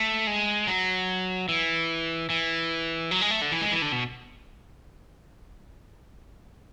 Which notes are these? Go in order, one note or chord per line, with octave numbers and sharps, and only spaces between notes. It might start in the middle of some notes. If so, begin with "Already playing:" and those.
Already playing: A3
G#3
F#3
E3
E3
F#3
G#3
A3
D3
E3
G#3
E3
D3
B2